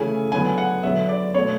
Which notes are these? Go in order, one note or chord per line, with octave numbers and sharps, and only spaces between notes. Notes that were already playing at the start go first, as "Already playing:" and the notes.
Already playing: C#3 E3 A3 G#5
D3 F#3 B3 G#5
F#5
D3 F#3 B3 E5
D5
B2 A3 C#5